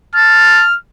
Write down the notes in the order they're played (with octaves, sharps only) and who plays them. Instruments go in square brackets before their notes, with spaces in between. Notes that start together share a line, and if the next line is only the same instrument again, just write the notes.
[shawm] A5 [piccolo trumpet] F6